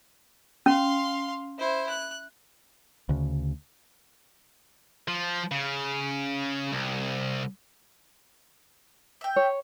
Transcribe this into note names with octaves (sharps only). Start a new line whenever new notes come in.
C#4 F5 C6
E4 C5
F#6
D2 C#3
F3
C#3
C2
E5 G5
C#5